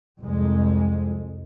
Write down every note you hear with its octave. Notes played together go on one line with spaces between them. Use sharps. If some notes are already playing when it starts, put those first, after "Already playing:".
C2 F2 G#3